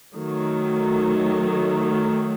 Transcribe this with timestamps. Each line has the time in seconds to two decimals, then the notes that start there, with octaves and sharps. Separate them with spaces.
0.16 D#3 F#3 A3